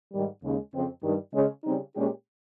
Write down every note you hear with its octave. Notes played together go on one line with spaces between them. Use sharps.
G#2 D#3 G3
D#2 C#3 G#3
F2 C#3 F3 C4
G2 D#3 G3
C#3 G#3 C#4
C#3 G3 C4 D#4
A#2 G#3 C#4 G4